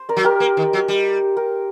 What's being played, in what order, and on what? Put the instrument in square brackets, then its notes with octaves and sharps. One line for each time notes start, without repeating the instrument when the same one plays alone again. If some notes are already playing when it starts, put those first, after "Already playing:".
Already playing: [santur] C5
A#4 D5
[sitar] F#3
[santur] G4 A#4
[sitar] A#3
D#3
F#3
G3
[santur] G4 A#4